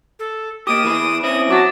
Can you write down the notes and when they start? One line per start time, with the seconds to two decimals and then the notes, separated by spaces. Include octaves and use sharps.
0.19 A4
0.67 A#3 G4 D6 D#6 D7
0.84 E3 G#4 B4
1.23 C4 C#4 E4 D#6
1.50 F#3 A5 D6 A6 A#6